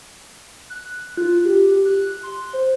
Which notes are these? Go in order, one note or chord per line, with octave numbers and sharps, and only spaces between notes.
F#6
F4
G4
G4
F#6
C6
C5